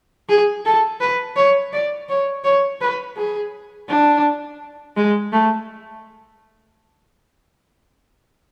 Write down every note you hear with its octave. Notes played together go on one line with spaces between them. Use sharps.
G#4
A4
B4
C#5
D5
C#5
C#5
B4
G#4
D4
G#3
A3